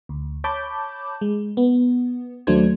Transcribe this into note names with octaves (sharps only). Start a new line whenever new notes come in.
D2
C#5 A5 B5 D6 G6
G#3
B3
D#2 F#3 A3 D4 C5 G#6